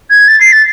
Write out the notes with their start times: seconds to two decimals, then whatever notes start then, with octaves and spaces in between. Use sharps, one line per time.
0.10 G#6
0.28 A6
0.40 C7
0.52 A6